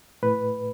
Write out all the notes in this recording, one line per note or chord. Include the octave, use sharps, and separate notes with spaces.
A2 B4